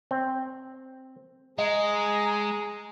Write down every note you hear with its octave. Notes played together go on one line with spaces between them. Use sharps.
C4
G#3 G#4 D#5 A#5